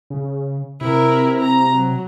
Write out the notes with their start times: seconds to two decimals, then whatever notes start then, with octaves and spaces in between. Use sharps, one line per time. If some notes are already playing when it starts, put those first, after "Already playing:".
0.10 C#3
0.81 C3 E4 A#4
1.41 A#5
1.73 F#3